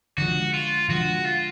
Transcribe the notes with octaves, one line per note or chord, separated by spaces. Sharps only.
D3 F3 G#3 F#4
F4
D3 F3 G#3 F#4
F4